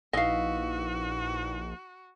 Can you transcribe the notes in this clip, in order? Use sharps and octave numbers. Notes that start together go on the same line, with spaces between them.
A#1 D#4 E4 F#4 B4 D#5 F5